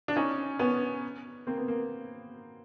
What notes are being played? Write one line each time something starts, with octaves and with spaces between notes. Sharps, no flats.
D4
C#4 D#4
B3 C#4
A#3 C4
B3
A#3